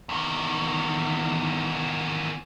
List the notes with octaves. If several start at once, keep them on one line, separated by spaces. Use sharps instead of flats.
E2 D#3